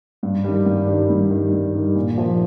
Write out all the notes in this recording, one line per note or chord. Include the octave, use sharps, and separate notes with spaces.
G2
D#3 G3
G2
D#3 G3
G2
D#3 G3
G2
D#3 G3
A#2
F3 A#3